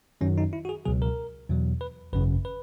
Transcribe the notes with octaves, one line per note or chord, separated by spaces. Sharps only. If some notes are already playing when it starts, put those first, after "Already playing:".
F#2 D#3 F#3 C#4
D#4
E4
F#4
G#4
C#2 B2 F#3 G#4
A#4
E2 B2 F#3
B4
G#1 F#2 C#3 B4
B4